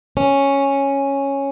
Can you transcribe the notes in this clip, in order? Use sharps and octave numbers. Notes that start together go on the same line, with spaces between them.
C#4